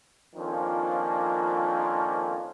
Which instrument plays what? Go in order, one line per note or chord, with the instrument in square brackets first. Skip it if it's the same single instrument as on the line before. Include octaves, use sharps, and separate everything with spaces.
[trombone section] F2 D#3 F3 A#3 C#4 D4